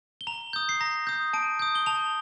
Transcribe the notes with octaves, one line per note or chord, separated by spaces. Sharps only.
G7
A#5 F7
D#6 G6
C7
A#5 A#6
D#6 G6
A5 D7
D#6 G6
G7
A5 F7